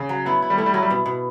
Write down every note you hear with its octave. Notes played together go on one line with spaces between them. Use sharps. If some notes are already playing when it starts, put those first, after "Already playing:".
Already playing: C#3
F#3
B3 E4
E4
G3
A3 E4
G3
F#3 E4
G3
B2
B2